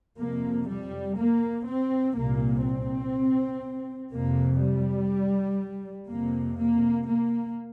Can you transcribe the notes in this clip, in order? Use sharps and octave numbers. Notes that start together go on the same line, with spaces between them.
F2 C3 A#3
G3
A#3
C4
C2 A#2 A#3
C4
F2 C3 A#3
G3
F2 C3 A#3
A#3
A#3